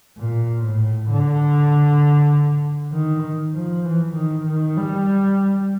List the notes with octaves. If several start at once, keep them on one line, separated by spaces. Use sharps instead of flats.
A#2
A2
D3
D#3
F3
E3
D#3
D#3
G3